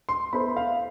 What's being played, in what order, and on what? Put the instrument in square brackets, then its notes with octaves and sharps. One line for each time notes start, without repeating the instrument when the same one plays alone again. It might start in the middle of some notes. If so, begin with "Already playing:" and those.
[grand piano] C6
[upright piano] B3 E4 A4 C5 [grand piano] B5
[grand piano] F5